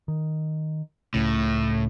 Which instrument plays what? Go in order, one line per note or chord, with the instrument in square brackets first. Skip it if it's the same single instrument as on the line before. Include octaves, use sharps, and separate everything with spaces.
[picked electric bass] D#3
[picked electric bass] C#2 C#3 [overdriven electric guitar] A2